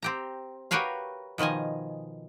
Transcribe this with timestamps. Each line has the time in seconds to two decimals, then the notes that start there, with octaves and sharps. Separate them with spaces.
0.03 C4 G4 A#5
0.71 F#4 G4 A#4 B4 C#5 F5
1.38 B2 D#3 F3 D#5 G#5